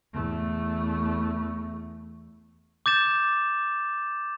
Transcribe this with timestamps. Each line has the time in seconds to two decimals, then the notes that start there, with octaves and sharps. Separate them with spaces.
0.13 E2 A3
2.86 D6 G6 A6 E7